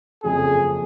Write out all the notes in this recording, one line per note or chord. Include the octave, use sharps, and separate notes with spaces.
F#1 F2 C#3 G#4